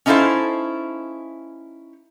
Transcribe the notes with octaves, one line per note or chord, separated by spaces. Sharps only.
C#4 D#4 E4 A4 C5 F5